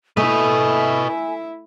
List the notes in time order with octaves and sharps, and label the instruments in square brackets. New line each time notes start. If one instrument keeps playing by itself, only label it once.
[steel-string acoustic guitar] A3 [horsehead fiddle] E4 E5 [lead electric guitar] B4 D#5 [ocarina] G#5